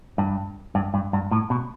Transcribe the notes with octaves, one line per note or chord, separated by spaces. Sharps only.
G2
G2
G2
G2
A2
B2